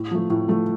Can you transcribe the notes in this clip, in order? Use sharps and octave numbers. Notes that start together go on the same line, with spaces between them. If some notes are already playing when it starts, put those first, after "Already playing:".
Already playing: A2
F3 A3
A2
F3 A3